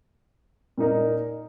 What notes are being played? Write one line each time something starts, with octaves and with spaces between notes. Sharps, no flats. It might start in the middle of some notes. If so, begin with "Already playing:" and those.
A#2 A#3 D#4 A#4